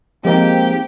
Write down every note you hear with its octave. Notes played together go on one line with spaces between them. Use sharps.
F3 G#3 A#3 C4 D#4 G4